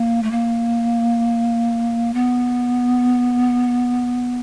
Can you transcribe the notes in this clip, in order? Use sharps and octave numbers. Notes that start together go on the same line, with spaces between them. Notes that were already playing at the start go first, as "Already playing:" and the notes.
Already playing: A#3
A3
A#3
B3